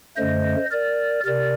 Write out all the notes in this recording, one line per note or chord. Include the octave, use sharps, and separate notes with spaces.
F#2 D3 A3 C5 D#5
A#4 D5
C3 A#4 D5